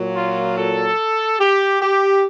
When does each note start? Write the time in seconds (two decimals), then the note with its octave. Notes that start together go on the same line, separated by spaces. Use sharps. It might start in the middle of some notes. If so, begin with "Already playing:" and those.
Already playing: A#2 F#3
0.15 F4
0.57 A4
1.39 G4
1.82 G4